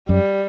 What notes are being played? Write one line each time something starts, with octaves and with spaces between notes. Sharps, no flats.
F#2 G3